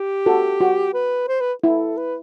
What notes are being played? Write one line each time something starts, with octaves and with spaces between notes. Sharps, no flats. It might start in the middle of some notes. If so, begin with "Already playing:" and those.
Already playing: G4
F#4 A4
F#4
B4
C5
B4
E4 A4
B4